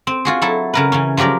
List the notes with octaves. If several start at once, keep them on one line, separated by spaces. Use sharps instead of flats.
C4
F4 F#4 G#4
F#3 E4 A4
C#3 A#4 B4
C#3 E3 C#4
F3 F#3 G4 A#4 D5